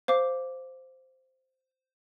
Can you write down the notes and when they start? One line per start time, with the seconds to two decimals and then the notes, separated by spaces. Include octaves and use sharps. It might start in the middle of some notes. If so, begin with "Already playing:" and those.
0.08 C5 F5 D6